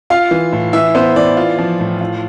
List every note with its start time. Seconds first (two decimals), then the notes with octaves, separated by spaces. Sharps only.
0.10 F4 F5
0.31 E3
0.53 A2
0.73 E3 E5
0.95 B3 C5
1.16 E3 D5
1.37 F4
1.58 F3
1.80 A2
2.01 F4